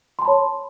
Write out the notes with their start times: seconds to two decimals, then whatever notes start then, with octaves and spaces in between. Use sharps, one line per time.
0.19 C6
0.22 A5
0.25 B5
0.28 C#5